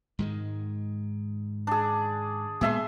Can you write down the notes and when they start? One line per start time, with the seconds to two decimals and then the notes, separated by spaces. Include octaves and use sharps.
0.19 G#2 D#3 G#3
1.67 D4 G#4
2.61 A#2 G#3 B3 G#4 E5 C6